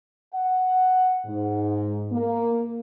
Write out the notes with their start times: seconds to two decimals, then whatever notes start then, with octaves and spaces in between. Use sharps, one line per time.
0.34 F#5
1.26 G#2
2.11 A#3